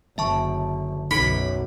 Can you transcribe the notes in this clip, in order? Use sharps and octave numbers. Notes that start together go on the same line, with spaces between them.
F#1 D3 E5 A5 C#6
B1 F#2 D#4 A4 B5